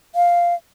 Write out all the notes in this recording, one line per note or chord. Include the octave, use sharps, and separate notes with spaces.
F5